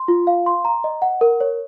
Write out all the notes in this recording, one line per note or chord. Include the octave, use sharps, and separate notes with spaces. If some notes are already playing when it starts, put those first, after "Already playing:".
Already playing: C6
F4
F5
C6
A#5
D#5
F#5
A#4
C#5